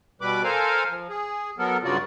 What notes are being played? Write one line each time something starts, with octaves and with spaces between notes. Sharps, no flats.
B2 G3 B4 B5 D6
A4 A#4 C5 F5 G#5 A#5
F3
G#4
F#3 B3 A4 A#4
G2 C#3 F#3 F4 F#4 D5